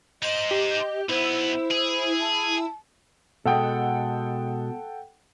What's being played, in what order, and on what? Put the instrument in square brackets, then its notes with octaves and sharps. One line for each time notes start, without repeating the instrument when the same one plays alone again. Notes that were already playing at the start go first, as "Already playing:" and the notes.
[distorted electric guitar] D#4 C5 [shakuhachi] D#5 [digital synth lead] D7
[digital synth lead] G4
[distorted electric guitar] B1 B3 [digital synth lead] E4 [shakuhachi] C5
[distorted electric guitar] G#4
[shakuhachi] A5
[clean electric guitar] B2 G#3 [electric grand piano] A4 F#5 G5